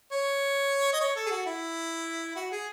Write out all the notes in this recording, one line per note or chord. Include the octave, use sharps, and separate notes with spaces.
C#5
D#5
C#5
A4
G#4
F#4
E4
F#4
G#4